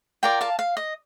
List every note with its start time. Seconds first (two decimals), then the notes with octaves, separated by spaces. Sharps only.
0.23 F4 A#4 D5 G5 A#5
0.41 F5 A5
0.59 F5
0.77 D#5